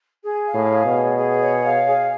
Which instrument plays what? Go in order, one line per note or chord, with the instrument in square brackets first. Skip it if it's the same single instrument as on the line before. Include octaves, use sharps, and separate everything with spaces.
[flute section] G#4
F5
[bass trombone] A2
[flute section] G#4
[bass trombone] B2
[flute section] C#5
G#4
C#5
F5
G#4